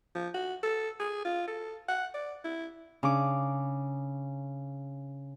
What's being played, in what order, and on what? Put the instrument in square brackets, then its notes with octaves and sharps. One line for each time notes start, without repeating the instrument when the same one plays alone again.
[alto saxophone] F3
F#4
A4
G#4
F4
A4
F#5
D5
E4
[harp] C#3 D4 D6